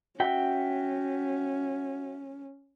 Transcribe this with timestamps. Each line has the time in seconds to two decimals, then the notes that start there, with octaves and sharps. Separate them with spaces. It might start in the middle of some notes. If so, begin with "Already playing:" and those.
0.20 C#4 F#4 E5 G5